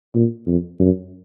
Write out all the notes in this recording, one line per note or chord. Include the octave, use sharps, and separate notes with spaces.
A#2
F2
F#2